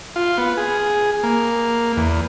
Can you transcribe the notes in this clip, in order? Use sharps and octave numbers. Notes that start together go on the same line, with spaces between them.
F4
B3
G#4
A#3
E2